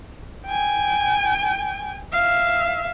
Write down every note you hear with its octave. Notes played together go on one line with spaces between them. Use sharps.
G5 G#5
E5 F5